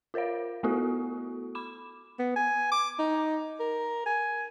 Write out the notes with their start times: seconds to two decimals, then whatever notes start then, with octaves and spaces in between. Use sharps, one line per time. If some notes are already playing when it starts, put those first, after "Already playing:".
0.14 F4 A#4 C5 C#5 F5
0.63 A3 B3 E4 F#4 A4
1.55 B5 D6 E7
2.19 B3
2.36 G#5
2.71 D6
2.99 D#4
3.60 A#4
4.06 G#5